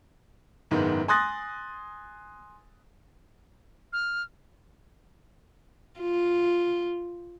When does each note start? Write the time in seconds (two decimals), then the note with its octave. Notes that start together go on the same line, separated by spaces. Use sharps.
0.71 F#1 G#2 D#3 B3
1.08 G#5 C6 D#6 F#6 A6 A#6
3.93 F6
6.00 F4